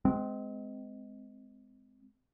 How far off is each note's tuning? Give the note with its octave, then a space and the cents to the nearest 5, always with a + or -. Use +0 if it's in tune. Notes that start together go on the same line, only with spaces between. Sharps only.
G#3 +10 C4 -25